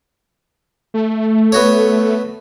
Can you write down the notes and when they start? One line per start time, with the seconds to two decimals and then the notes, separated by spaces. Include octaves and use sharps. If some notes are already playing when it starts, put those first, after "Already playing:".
0.94 A3
1.52 B3 F#4 C#5